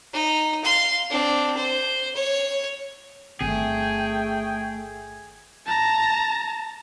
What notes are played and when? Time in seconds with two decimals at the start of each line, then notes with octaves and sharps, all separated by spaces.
0.13 D#4
0.64 F5 C6
1.10 C4 D4
1.57 C5
2.15 C#5
3.41 G1 D#3 A3 C4 G#4 G5
5.66 A5 A#5